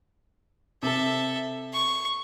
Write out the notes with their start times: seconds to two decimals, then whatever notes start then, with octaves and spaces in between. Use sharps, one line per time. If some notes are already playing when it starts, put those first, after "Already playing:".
0.83 C3 A4 E5
1.73 C#6